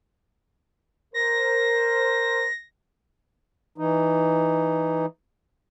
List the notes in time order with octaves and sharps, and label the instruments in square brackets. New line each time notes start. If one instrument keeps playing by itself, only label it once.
[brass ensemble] A#4 C5 [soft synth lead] A#6
[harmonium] E3 D#4